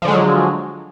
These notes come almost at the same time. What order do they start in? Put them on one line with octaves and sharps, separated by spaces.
F3 D3 G#3 F#3